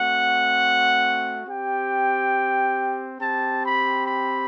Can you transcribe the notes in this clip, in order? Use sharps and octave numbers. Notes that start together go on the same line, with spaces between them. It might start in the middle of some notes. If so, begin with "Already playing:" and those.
Already playing: A3 C4 F#4 F#5
C4 G4 G5
C4 G4 A5
B5
B5